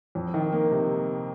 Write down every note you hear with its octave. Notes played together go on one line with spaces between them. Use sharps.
F2
D#3
A#3
C3